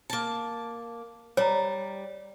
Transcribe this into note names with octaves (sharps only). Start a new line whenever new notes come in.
A#3 A5
G3 C#5 A#5